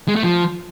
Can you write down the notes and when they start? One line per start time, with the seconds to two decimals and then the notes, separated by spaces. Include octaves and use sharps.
0.08 G#3
0.16 A3
0.23 F3